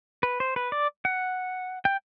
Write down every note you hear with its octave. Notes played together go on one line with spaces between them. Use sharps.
B4
C5
B4
D5
F#5
G5